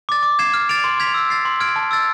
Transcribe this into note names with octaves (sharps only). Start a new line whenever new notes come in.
D6 A6
D6
G#6 C7 E7
F6
A6 D7 F7
C6
G#6 B6 F7
E6
A6 C7
C6
F6 G#6 D7
A5
E6 A6